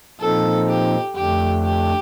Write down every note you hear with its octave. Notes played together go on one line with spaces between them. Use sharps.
A#2 F3 C4 D#4 A4
G4
F2 D3 A3 D4 G4
G4